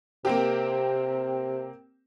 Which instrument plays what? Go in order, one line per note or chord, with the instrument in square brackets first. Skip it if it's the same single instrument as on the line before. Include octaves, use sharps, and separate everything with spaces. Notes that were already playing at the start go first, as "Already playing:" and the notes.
[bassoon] C3 [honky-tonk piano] A#3 C4 G4